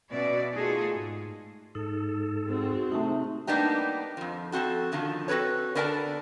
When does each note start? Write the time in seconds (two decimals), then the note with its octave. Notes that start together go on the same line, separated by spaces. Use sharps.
0.12 B2 C#4 F#4 B4 D5 E5
0.54 A3 D#4 F4 F#4 G#4 A4
0.95 G#2
1.75 G#2 D#4 A4
2.46 G#3 C4 F#4
2.92 C3 A3 D#4
3.47 G3 A#3 B3 D4 D#4 G4
4.17 F2 F3
4.52 F2 D#3 C4 F#4 A4
4.92 B2 D3 D#3 F3
5.28 C4 F#4 A4 B4 C#5
5.75 D3 B3 A#4 D5 F#5 A5